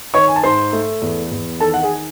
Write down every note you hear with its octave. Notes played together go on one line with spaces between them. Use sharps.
D#3 C#5 C#6
G#5
A5
G#2 C5 C6
A3
E2
E2
D#3 A4 A5
F#5
G#4 G#5